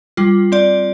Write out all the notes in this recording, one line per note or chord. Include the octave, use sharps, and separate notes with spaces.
G3 F4
C4 D5